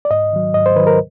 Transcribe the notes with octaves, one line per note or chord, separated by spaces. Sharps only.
D5
G#2 D#5
D#3 F#3
G#2 D#5
C5
D#3 F#3 B4
A#4